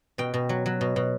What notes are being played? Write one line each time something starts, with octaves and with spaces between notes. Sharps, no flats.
B2 G5
B2
F#3
F#3
B2
B2